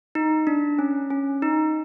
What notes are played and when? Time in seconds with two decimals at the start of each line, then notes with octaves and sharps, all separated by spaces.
0.15 D#4
0.47 D4
0.79 C#4
1.10 C#4
1.42 D#4